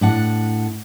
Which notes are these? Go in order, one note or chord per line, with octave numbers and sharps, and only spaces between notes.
A2 D4 F#5